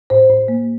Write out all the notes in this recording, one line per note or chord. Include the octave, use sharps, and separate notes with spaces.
A2 C5
A2
A#3